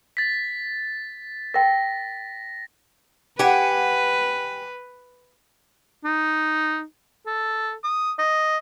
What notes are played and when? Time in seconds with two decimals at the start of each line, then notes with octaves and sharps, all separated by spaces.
0.17 A6 B6
1.54 A#4 G5 A#6
3.39 G4 B4 F#5 G#5
6.05 D#4
7.27 A4
7.84 D#6
8.19 D#5